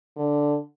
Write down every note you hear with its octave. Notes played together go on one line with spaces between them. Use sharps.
D3